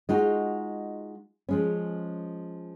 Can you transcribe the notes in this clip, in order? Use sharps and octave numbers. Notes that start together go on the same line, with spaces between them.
G#3 D#4 F4 F#4
F3 G#3 C#4